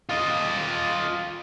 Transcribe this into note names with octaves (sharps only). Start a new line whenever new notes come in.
F4 D#5